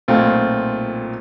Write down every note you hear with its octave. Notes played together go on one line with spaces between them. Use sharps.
B1 A#2 A3 C4 F4